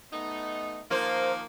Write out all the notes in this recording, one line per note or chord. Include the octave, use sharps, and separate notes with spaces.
A3 B3 D#4
D#3 F3 A#3 F4 C5